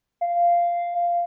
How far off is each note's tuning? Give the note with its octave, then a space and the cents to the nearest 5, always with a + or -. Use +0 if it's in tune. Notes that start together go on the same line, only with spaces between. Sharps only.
F5 -10